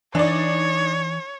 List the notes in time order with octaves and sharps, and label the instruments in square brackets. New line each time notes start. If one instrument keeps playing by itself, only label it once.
[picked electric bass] E3 [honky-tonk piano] D4 D#4 D5 [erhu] C#5